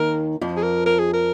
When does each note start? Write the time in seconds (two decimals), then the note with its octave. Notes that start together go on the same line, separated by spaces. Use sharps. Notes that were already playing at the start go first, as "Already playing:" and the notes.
Already playing: D#2 D#3 A#4
0.41 F2 F3
0.57 G#4
0.63 A#4
0.86 A#4
0.99 G#4
1.13 A#4